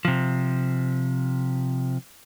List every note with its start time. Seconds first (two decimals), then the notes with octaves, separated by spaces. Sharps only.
0.05 C3 F3